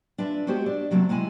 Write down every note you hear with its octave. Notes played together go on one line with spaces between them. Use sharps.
D4 F4 B4 E5
G#3 B3 F#4 G4 C5 E5
D4
C3 F#3 A3 A#3 C4
C3 G#3 E4 G#5